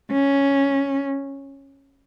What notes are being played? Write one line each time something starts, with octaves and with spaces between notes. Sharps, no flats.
C#4